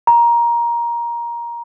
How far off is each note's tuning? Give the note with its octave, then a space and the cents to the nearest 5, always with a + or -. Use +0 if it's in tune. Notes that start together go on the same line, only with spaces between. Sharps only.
A#5 +15